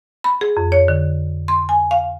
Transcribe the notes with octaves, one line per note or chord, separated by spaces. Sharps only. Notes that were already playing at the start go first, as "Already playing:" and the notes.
B5
G#4
F2
C#5
D3
C6
G#5
F5